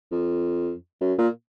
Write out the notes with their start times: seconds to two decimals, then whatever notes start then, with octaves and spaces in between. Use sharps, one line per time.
0.12 F2
1.01 F#2
1.18 A#2